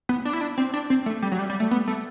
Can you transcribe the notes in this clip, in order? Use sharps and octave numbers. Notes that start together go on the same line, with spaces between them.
B3
D4
E4
D4
C4
D4
C4
A3
G3
F#3
G3
G3
A3
B3
A3